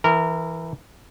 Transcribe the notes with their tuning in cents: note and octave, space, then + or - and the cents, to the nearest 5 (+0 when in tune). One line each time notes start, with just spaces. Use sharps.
E3 +0 A#4 -20